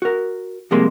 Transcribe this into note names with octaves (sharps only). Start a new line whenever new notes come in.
F#4 A#4
F2 C3 G3 G#3 A#3 C6